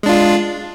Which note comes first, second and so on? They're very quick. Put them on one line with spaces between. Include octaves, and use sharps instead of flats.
G#3 D4 F4